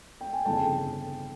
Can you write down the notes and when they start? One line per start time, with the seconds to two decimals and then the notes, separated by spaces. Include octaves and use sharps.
0.21 G5
0.33 G#5
0.45 G1 F2 C#3 E3 G5 A5